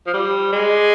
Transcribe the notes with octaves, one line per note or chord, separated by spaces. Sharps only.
F3
G3
G#3